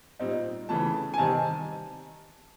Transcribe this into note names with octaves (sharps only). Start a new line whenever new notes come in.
A#2 G3 C4 D#4
C#3 E3 A3 A5
G#5
C3 D#3 G3 C4 D#4 A5